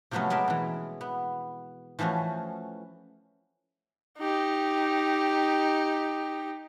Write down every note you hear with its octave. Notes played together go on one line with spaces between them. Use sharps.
C3 F3 F#3 A3 B3 C#4
G#3 B3 A#4 D5 E5
B2 E3
B3
E3 F3 A3 C#4 F#4
D#4 G4